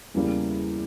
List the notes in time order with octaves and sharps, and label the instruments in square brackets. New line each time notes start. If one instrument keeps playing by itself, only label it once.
[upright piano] E2 C#3 E3 G3 A#3